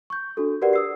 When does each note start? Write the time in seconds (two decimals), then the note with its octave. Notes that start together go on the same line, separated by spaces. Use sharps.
0.10 C#6 G6
0.37 D4 F#4 A4
0.61 F#4 G4 A#4 B4 D5 F#5
0.73 D#6 E6 C7